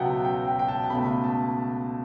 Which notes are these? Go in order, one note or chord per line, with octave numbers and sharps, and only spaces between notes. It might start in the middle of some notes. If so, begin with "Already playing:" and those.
Already playing: C#2 B2 F#3 B3 E5 F#5 G5
G5
G5
G5
A5
C#2 B2 A3 B5
A5